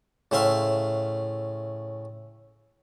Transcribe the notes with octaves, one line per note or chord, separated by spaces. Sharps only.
A2 C#3 C5 E5 F5 C6